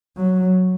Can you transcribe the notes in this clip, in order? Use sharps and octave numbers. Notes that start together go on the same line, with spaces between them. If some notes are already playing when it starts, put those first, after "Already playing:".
F#3